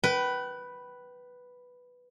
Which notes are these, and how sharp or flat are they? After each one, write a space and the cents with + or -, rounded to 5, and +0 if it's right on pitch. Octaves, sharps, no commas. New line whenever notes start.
B4 +0 G5 -35